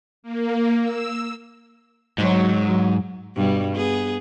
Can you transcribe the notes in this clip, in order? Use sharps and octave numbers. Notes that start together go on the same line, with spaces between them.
A#3
E6
G#2 F#3
G2 B2 G3
B3 G#4